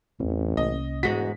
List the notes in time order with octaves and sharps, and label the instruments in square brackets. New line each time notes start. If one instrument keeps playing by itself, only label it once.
[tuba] A1 [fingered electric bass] E2 C4
[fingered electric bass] C2 A#3 C#4 [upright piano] D#5
[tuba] E1 [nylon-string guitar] G#2 G#3 F#4 [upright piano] B6